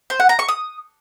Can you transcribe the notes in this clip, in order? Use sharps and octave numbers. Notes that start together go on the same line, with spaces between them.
C5
F#5
A#5
C#6
D#6